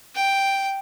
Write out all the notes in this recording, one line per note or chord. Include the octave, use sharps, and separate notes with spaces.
G5